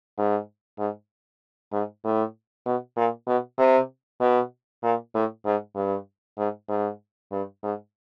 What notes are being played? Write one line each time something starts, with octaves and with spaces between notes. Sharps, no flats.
G#2
G#2
G#2
A2
B2
A#2
B2
C3
B2
A#2
A2
G#2
G2
G#2
G#2
G2
G#2